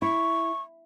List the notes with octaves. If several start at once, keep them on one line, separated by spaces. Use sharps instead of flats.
E4 C#6